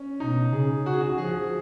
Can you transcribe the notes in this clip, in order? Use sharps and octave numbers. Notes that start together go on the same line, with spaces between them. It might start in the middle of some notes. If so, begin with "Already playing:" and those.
Already playing: C#4
B2 D#4
C#3 G#4
C#3 F#4
G#4
F#4
F3 G#4